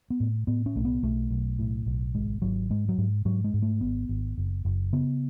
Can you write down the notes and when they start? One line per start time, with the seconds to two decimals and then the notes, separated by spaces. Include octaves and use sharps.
0.10 B3
0.20 A2
0.47 A2 B3
0.66 C#4
0.75 B1 A3
0.85 B3
1.03 B1 A3
1.30 B1
1.59 A2
1.86 B1
2.14 G#1 G#3
2.42 G#1 F#3
2.70 G#2 G#3
2.89 F#3
2.98 G#2
3.25 G#2 F#3
3.44 G#3
3.54 G#2
3.62 A3
3.81 G#1 B3
4.09 G#1
4.38 F#1
4.65 F#1
4.93 C#3 B3